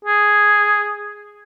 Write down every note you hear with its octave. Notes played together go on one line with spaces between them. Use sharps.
G#4